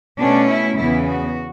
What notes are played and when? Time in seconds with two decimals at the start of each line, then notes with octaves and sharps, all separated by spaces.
0.19 B2 A3 C#4 D4
0.49 E4
0.78 E2 C#3 E3 B3 E4
1.08 F#4